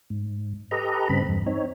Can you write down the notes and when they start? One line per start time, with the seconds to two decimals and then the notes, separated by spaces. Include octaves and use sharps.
0.10 G#2
0.71 G4 A4 B4 D#5 A#5
1.09 G2 C#3 C4 B5
1.27 E2 G2
1.46 C4 D#4 C#5